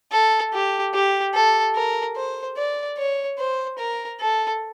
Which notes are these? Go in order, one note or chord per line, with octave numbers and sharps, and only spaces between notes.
A4
G4
G4
A4
A#4
C5
D5
C#5
C5
A#4
A4